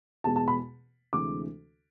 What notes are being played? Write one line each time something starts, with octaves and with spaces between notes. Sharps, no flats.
E2 B2 G#3 A5
A5
B5
D2 C3 E3 G#3 D6